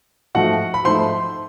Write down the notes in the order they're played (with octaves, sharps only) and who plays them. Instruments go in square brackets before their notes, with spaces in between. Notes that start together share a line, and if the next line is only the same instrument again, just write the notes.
[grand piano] G#2 F3 A3 F#4 F#5
B5
G#2 F3 A3 C5 C6